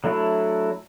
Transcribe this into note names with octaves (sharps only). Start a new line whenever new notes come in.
F#3 A3 D4 E4 F#4